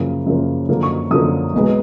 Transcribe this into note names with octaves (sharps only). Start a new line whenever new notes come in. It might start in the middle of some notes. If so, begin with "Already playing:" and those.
Already playing: F#2 C#3 F3 A#3
F#2 C#3 F3 A#3
F#2 D3 F3 A#3
C#6
F#2 D3 F3 A#3 D#6
B1 B2 G#3 B3